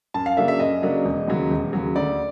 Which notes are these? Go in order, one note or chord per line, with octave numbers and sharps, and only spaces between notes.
F#2 A5
F5
C#3 F#3 A#3 D4 E5
E5
F#2 D#5
C#3 F#3 A#3 D4
E1
D#2 C#3 F#3
E1
D#2 C#3 F#3
D2 D5